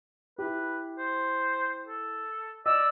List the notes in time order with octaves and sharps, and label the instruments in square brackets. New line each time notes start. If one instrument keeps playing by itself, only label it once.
[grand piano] E4 G4 [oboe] B4
[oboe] C5
A4
[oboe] D5 [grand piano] D#5 [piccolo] E6